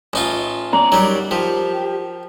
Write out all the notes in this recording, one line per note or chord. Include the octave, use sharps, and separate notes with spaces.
A1 D#4 F4
B3 C#4 D5 A#5
F#3 G3 D#4 A#4 D5
F3 G4 A#4